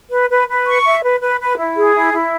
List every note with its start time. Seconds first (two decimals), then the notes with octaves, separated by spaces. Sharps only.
0.10 B4
0.29 B4
0.47 B4
0.65 C#6
0.84 E5
1.02 B4
1.20 B4
1.39 B4
1.58 E4
1.75 G#4
1.94 E4
2.12 E4